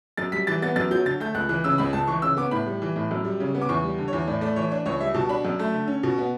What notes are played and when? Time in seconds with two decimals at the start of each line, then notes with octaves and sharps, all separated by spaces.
0.17 F#2 A6
0.32 G3 B6
0.47 E3 A6
0.62 B3 A6
0.76 F#2 A6
0.91 F#3 G6
1.05 D3 A6
1.20 A3 G6
1.34 C#2 F#6
1.49 E3 F#6
1.64 C#3 E6
1.78 C#2 B5
1.93 C#2 A5
2.07 E3 C#6
2.22 C#3 E6
2.37 B3 D6
2.51 A2 B5
2.66 G3
2.82 E3
2.96 A2
3.11 F#2
3.24 G3
3.40 C#3
3.55 B3
3.61 D6
3.69 E2 C#6
3.84 G3
3.98 D3
4.08 C#5
4.13 E2
4.27 A2 D5
4.41 A3 D5
4.56 E3 C#5
4.71 D4 D5
4.86 C#2 C#5
5.01 G3 E5
5.14 B2 A5
5.29 D4 B5
5.45 F#2
5.59 A3
5.74 D3
5.88 C#4
6.03 B2
6.18 B3